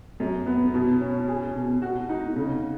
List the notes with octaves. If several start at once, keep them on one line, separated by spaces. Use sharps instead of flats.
F#2
B3
B2
C#4
G#4
B2
F#4
D#4
C#3